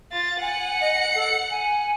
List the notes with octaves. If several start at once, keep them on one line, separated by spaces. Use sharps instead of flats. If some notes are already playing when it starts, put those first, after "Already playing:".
F4 A6
F#5 G#5 C#7
D#5
A4
G#5